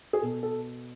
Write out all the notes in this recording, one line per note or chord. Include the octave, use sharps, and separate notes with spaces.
G#4
B2 A4
A4